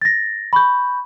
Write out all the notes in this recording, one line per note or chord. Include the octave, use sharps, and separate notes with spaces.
A6 A#6
B5 C#6 G6